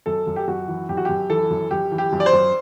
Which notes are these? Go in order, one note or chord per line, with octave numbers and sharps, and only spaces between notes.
F#2 A4
F#2
G4
F#2 F#4
E3
F#2 G4
F#4
F#2 G4
E3 A4
F#2
F#2 G4
E3
G4
F#2
D5
C5
F#2